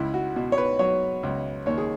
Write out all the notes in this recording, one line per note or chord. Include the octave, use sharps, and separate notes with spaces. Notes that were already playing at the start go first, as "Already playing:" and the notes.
Already playing: C#2 E4
F#4
B2
C#5
B4
F#3 C#5
C#2
D#2 C#5
G#4